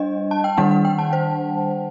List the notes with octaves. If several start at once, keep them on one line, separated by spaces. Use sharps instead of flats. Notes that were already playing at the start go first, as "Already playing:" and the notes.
Already playing: G3 D4 D#5
A5
G5
D#3 G3 D4 F#5
F#5
G5
A5
C5